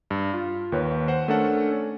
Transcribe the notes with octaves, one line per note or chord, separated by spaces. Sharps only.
G2
F4
D#2 D#3 B4 C#5
C5 F#5
A3 C#4 D4 A4 A#4 F#5
C#4